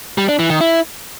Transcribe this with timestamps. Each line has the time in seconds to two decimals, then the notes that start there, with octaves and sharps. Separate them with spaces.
0.18 G3
0.29 D4
0.39 E3
0.50 D#3
0.61 E4